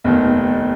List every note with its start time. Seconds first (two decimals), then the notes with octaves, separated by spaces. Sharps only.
0.04 F1 D#2 D#3 B3